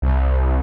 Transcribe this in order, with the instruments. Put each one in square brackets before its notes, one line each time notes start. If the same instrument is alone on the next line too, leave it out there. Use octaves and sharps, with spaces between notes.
[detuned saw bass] C2